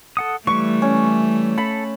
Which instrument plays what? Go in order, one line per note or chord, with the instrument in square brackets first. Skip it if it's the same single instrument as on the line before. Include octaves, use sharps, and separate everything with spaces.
[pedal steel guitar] A4 F#5 D#6
[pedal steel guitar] E3 G3 [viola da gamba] A3 [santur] C#6
[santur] C#4
[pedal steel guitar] A4 [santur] B5